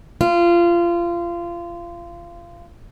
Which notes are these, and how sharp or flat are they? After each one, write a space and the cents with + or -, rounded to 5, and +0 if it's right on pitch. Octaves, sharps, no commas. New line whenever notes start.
F4 -25